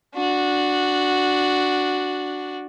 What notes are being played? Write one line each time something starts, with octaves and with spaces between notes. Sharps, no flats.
D4 F#4